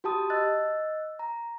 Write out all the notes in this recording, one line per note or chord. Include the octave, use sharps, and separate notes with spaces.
F#4 G4 A5 D#6
D#5 E6 F#6 A6
A#5